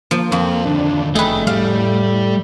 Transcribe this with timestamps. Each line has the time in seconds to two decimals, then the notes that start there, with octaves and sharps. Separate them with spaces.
0.11 F3 A#3
0.32 F2 A4 F5
0.65 D2 D#3 D4
1.15 F#1 A3 G#4 B4 D#5 G5
1.47 A2 G3 F5